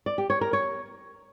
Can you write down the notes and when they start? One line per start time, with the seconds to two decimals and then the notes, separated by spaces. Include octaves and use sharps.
0.06 D5
0.18 G4
0.30 C#5
0.41 A#4
0.53 C#5